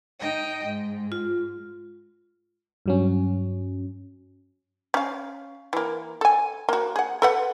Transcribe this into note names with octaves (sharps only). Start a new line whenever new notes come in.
D#4 D#5 G5
G#2
F4
G2 F#3 C#4
C#4 F5
E3 A#3
A4 G#5
A#3 F#4
G#4 F#5
A4 B4 F#5